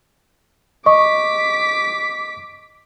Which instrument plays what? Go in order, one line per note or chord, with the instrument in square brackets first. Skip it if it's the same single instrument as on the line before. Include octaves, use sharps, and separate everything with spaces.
[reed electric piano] D#5 [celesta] C#6 [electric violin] D6 B6